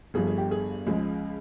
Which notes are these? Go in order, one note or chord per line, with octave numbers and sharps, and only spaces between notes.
G1 G2 F3 G#4
G#4
G4
G#4
C#2 C#3 F3 G#3